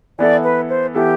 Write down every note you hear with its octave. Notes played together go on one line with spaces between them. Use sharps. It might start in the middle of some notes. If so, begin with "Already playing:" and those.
E3 B3 E4 A4 D5
B4
C5
E3 B3 E4 G4 A4